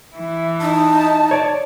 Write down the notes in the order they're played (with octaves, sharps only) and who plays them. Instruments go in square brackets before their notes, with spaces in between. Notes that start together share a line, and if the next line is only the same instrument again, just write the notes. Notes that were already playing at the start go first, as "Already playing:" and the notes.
[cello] E3 E4
[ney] D#4 [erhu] A5
[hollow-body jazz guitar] C#5 D5